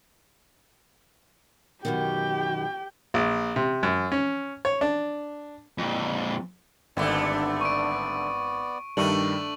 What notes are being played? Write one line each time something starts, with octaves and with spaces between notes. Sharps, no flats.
F#2 B2 D#3 G4 G5
A#1
C3
F#2
C#4
C#5
D4
F2 A#2
G#1 G2 D3 A3 B3 D5
C#6 D7
G2 D#3 G3 A3 D4 C#6 F#7